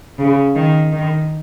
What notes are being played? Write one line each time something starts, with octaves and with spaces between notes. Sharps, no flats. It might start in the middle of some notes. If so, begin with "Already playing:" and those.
C#3
D#3
D#3